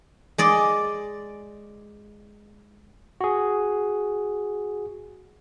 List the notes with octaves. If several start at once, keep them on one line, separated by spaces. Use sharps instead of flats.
G#3 D5 D#5
F#4 G#4